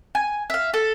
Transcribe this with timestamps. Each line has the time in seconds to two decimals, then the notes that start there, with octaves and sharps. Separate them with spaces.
0.15 G#5
0.50 E5 F5
0.74 A4